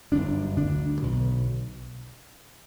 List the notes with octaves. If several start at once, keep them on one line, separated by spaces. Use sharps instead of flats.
G1 F#2 D3 D4
D2 D3 D4
B1 B2